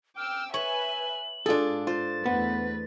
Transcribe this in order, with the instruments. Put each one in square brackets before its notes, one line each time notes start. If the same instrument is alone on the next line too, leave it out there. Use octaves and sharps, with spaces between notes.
[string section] G5 D6 E6 [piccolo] F6
[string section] B4 E5 G#5 [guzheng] C#5 [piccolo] F#7
[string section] G#2 [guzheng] D4 A4 [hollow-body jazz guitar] F4 G#4
[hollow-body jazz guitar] F4 [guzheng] C5 [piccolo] A6
[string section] E2 A3 B4 [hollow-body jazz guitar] B3